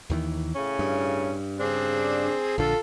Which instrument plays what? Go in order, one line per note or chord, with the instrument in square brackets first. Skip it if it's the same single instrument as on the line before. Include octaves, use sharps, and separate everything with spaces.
[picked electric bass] D#2 D#3 E3
[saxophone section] A2 C#3 C#4
[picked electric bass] G2
[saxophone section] C#3 D4 [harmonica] C4 G#4
[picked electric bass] A#1 D3 [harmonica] F4 A4